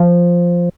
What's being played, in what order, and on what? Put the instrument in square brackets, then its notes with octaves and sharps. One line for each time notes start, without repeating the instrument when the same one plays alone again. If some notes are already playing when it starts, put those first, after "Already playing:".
Already playing: [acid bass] F3